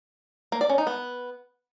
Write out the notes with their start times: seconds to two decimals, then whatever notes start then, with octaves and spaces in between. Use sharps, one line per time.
0.52 A#3
0.61 D5
0.69 C#4
0.78 D#4
0.87 B3